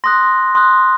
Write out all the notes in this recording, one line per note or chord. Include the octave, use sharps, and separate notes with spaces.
C6 D#6 F#6 A#6
C6 D#6 F#6